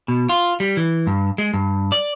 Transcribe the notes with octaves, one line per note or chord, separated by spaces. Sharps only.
B2
F4
G3
E3
G2
G#3
G2
D5